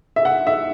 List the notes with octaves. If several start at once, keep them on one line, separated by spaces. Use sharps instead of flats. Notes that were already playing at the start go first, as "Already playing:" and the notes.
E5
F#5
E5